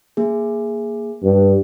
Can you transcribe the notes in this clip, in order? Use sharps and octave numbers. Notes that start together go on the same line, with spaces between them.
A#3 G#4
G2